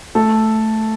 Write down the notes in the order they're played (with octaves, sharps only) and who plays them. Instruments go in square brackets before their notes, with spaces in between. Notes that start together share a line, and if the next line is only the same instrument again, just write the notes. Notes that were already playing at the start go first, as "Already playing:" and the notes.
[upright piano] A3 A4